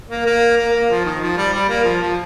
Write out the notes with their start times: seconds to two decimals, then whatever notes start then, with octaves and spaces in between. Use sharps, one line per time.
0.10 A#3
0.26 A#3
0.57 A#3
0.73 A#3
0.90 F3
1.05 D#3
1.21 F3
1.37 G3
1.53 G3
1.69 A#3
1.84 F3
2.01 F3